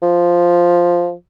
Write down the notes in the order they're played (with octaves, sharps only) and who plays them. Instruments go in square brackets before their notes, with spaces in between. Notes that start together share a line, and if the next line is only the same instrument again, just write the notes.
[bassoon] F3